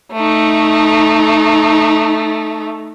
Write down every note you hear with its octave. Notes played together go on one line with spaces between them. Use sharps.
A3 D#4